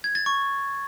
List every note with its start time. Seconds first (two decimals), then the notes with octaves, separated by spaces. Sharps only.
0.04 G#6
0.15 A6
0.26 C#6